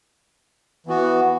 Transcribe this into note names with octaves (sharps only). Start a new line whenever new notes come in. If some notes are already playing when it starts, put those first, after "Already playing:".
E3 B3 F#4